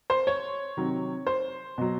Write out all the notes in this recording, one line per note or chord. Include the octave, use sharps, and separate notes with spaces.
C5
C#5
C3 D#3 F#3
C5
B2 F#3